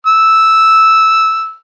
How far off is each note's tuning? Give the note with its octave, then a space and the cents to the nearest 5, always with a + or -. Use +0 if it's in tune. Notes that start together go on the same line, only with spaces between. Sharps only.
E6 -5